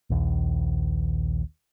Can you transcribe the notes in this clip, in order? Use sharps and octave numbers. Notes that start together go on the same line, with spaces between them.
A#1 D#2